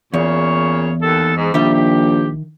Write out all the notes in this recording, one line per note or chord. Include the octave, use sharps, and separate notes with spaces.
E2 A#2 C#3 C#5
D#2 A4
G#2
A#1 D#3 G3 G4 E5
G4